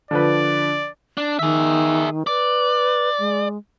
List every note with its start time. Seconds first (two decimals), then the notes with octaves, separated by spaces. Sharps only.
0.11 D3 F3 B4 D5
1.17 D4
1.39 D#3 G#4 E5
2.27 B4 D5
3.19 G#3